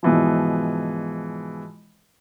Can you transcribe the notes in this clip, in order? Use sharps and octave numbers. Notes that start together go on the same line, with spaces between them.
G#2 B2 E3 F3